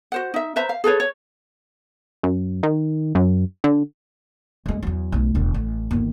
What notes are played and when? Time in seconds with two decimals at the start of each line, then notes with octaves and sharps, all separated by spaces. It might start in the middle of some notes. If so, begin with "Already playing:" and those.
0.12 F#4 C5 F#5
0.34 D#4 E5
0.56 B4 C5 E5 A#5
0.69 F5
0.84 G#4 A4 B4 C#5
1.00 C#5
2.23 F#2
2.63 D#3
3.15 F#2
3.64 D3
4.66 F#2 G#3
4.82 E2 F#3
5.12 B1 A3
5.35 E1 D3
5.54 A1
5.91 G1 D#2